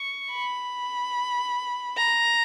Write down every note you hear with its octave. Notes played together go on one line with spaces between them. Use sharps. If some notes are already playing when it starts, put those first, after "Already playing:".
Already playing: C#6
B5
A#5